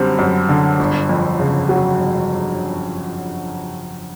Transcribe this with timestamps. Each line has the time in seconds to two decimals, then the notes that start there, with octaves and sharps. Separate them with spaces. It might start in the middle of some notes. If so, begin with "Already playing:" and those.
Already playing: F#2 D3 G3 C4
0.19 F#2
0.49 D3
0.79 G1
1.09 F2
1.40 C#3
1.69 F#3
1.99 G1